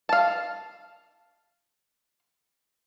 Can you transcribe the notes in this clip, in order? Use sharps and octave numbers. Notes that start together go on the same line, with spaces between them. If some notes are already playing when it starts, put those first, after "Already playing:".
F5 A5